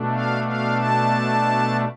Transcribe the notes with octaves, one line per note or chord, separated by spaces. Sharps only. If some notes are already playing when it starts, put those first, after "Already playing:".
Already playing: B2 A3 D4
F5
F5
A5